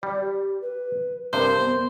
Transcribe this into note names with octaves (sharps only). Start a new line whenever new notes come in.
G3 D5
G4
B4
G2 C3 A#4 C5
B3